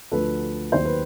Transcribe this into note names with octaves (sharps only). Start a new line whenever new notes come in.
D2 D3 F3 A4 B4
D#2 D#3 F#3 C5
B4